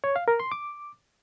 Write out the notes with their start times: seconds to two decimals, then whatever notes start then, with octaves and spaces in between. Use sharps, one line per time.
0.04 C#5
0.16 F5
0.28 A#4
0.40 C6
0.52 D6